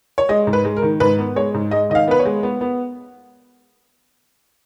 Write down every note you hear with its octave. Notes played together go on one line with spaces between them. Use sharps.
C#5
G#3 D#5
G#2
B4
G#3
A#4
D#3
G#2 B4
B3
G#3 C#5
G#2
G#3 D#5
D#3 D#5
F5
B3 B4
C#5
G#3
B3
B3